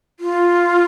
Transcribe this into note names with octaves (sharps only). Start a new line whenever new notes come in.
F4